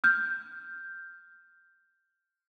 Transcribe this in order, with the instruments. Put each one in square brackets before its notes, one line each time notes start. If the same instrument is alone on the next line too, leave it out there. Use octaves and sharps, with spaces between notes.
[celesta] F6 G6